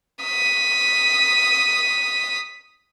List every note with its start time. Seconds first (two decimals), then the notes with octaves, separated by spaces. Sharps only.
0.24 D#6 B6